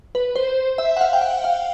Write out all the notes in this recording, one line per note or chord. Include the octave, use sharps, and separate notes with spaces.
B4
C5
E5
F#5
F5
G5
F#5
F5